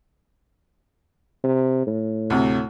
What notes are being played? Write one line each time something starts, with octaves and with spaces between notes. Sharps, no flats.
C3
A2
D2 C3